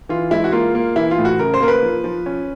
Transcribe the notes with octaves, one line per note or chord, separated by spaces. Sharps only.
E3 F4
G#3 E4
F#4
A#3 F4
A#3
E3 E4
F4
A2
F#4
C#3 A#4
C5
A#3 A#4
B4
F3
F3
C#4